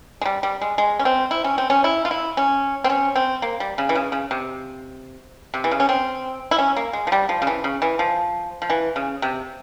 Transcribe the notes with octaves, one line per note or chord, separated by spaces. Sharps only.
G#3
G3
G3
G#3
G#3
C#4
C4
E4
C#4
C4
C#4
E4
F4
E4
C#4
C4
C#4
C4
A#3
G3
C#3
E3
C#3
C#3
C3
C3
E3
C#3
C#4
C4
E4
C#4
A#3
G#3
F3
G3
F3
C#3
E3
C#3
E3
F3
F3
E3
C#3
C3